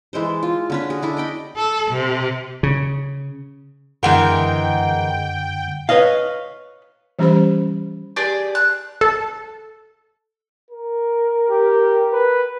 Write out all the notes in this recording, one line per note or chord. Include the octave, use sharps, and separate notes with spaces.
E3 G#3 A4 C5
F4
D3 C#4 B4
F#4 G#4
D4 E4 A4
D#5 G5 B5
A4
C3
C#3
F#2 D3 E3 G#3 A#4 F#5 G5
B4 C#5 D#5 F5
E3 G3 C#4 G4 C5 B5
G4 G#4 D5
F#6
A4
A#4
G4
B4